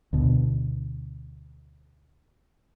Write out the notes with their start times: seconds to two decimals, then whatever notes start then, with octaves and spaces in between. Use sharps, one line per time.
0.13 D2 B2